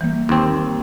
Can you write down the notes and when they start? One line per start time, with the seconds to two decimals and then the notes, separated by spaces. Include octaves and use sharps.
0.01 E3 G3 A#3
0.29 D#2 C4